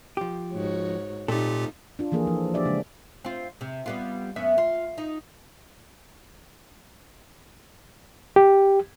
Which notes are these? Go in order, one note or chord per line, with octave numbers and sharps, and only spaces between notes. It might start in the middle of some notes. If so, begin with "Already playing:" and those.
F3 G4
G#2 F#4 C#5
A#2 A3 C4 D#4 F4 G4 A4
D4 F4
E3 F3 A#3 G#4 A4
F3
D4 G4 D5 E5
C#3 G#3 C#4 D4
C4 F4
C3
G3 B3 F4
F#2 B3 E5
F4
D#4
G4